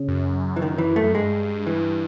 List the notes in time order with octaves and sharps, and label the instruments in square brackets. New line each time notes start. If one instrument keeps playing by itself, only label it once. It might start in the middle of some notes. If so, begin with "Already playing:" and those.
Already playing: [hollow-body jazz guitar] C#3
[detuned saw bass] F#2
[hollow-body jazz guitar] E3
D#3
E3
A3
[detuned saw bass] F#2
[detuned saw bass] G2 [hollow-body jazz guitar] G#3
[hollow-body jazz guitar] E3